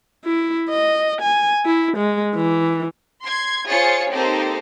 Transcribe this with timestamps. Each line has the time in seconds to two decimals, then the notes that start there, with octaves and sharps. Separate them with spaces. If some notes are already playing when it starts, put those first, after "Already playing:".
0.25 E4
0.69 D#5
1.22 G#5
1.65 E4
1.97 G#3
2.35 E3
3.23 C6 G#6
3.68 F4 G#4 C5 C#5 A6 C#7
4.11 A#3 C4 D#4 G4 A4 C5